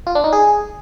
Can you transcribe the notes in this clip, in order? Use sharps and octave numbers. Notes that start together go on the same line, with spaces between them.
F4
D4
D#4
G#4